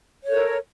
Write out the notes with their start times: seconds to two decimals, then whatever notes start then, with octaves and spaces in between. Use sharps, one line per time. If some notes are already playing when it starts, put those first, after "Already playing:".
0.24 C#5
0.27 A4
0.31 A#4